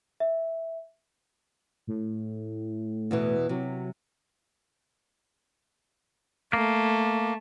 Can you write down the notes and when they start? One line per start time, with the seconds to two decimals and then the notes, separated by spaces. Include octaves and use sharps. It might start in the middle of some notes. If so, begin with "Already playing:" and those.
0.20 E5
1.87 A2
3.11 E2 B2 E3
3.49 C3 F#3
6.53 A3 A#3